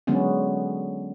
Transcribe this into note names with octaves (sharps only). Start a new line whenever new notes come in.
D3 F#3 G#3 B3 C#4